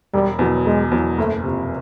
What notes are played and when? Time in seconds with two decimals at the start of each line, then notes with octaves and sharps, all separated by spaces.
0.13 E1 G3
0.39 E2 B2 F#3
0.66 E1 G#3
0.92 E2 B2 F#3
1.18 F#1 A3
1.44 F2 C3